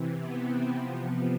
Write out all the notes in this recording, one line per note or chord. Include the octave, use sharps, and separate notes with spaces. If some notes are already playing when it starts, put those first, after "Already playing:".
Already playing: C3 E3
B3
C4
C3 F3 B3